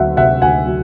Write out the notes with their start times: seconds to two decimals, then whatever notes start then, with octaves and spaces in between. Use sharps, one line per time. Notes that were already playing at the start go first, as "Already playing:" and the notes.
Already playing: D2 F#3 E5 F#5
0.17 C3 E5 F#5
0.42 D2 F#5 G#5
0.67 F#3